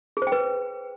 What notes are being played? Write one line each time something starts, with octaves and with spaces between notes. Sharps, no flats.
G#4
C5
G5
B4